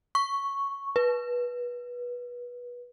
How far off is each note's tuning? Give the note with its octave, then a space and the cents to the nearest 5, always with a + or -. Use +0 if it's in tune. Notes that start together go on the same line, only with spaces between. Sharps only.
C#6 +0
B4 -20